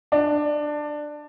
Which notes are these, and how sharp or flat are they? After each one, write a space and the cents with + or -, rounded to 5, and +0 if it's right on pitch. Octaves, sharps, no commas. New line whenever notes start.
D4 +15